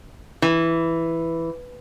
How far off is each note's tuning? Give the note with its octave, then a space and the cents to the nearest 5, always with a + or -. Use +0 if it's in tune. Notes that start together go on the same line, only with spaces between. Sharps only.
E3 +0